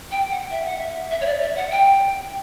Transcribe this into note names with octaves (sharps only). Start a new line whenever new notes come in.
G5
F#5
E5
F#5
E5
E5
C#5
D5
E5
F#5
G5